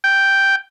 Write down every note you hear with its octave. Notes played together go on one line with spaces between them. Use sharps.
G5